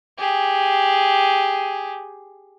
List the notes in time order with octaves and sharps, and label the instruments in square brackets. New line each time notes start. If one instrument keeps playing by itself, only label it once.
[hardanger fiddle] G4 G#4